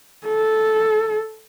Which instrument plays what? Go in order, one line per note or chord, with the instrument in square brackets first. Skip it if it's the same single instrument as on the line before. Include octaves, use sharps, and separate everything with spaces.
[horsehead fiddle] A4